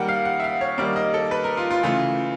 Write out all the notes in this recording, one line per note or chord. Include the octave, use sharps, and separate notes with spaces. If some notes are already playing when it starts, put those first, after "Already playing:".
Already playing: D#3 G3 A#3 F#5 G5
F5
F#5
E5
F5
C#5
D#3 G3 A#3 D5
D#5
A4
B4
A#4
F4
F4
C#3 E3 A3 F4